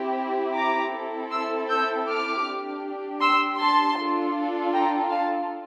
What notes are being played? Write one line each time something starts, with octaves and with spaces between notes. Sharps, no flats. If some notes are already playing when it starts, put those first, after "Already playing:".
Already playing: C4 E4 G4
A#5 D6
C4 E4 A4
C6 E6
E6 G6
D6 F6
D4 G4
C6 E6
A5 C6
D4 F4 A4
G5 A#5
F5 A5